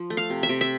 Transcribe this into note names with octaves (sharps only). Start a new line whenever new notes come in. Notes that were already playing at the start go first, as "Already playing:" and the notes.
Already playing: F3
A3
F5
C3
E5
C3
E5